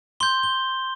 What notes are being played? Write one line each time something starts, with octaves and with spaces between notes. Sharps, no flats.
C6 G6 G7
G7